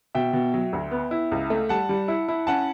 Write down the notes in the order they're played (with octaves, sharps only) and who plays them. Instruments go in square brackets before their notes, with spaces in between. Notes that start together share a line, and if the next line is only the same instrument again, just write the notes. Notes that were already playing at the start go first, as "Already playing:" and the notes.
[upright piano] B2 [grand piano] E5 G5
[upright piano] B2
F#3
D2
B3
E4
C#2
A3
[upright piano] G3 [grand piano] F#5 A5
[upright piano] G3
E4
E4
[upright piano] C#4 [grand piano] F#5 A5